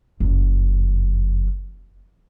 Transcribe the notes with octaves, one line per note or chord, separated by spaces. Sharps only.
F#1 F2